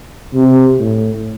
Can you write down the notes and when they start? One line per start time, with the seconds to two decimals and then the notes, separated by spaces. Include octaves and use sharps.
0.34 C3
0.80 A2